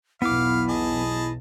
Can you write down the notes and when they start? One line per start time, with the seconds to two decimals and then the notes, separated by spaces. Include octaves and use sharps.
0.22 B1 E2 B3 E4 F5 D6
0.69 G#4 D#5 A5